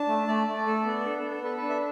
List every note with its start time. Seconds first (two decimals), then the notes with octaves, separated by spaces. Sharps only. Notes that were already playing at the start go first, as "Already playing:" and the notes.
Already playing: D4 A5
0.08 A3
0.28 A3 D5
0.47 A3
0.67 A4
0.85 B3
1.05 D4 A4
1.18 A4
1.24 B3
1.31 A4
1.44 A4 B4
1.57 B4
1.62 D4
1.69 E5